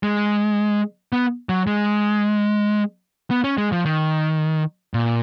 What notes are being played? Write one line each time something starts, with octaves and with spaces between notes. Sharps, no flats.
G#3
B3
F#3
G#3
B3
C#4
G#3
F3
D#3
A#2